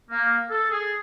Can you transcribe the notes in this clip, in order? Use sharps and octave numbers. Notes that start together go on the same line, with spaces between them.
A#3
A4
G#4